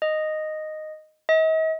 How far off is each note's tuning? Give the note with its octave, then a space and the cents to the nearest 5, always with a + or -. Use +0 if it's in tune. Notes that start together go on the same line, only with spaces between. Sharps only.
D#5 -5
D#5 +45